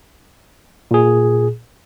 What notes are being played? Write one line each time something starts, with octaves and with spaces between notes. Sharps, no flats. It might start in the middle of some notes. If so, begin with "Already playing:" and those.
A#2 G#4